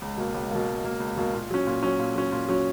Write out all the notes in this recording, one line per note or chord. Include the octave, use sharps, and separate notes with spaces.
C#2
B2 A#3
C#2
B2 A#3
C#2
B2 A#3
C#2
B2 A#3
A#2
F#3 C#4
A#2
F#3 C#4
A#2
F#3 C#4
A#2
F#3 C#4